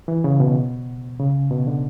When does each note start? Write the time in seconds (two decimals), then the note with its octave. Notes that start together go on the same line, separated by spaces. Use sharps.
0.08 E3
0.24 C#3
0.40 B2
1.19 C#3
1.51 B2
1.67 D3